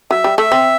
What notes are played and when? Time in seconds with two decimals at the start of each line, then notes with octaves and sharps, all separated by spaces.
0.11 F#3 E5
0.24 G3
0.38 A3 E5
0.52 C4